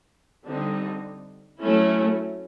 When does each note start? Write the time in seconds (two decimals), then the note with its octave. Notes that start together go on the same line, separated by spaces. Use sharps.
0.47 D3 G3 C4 D#4
1.61 F#3 A3 C#4 E4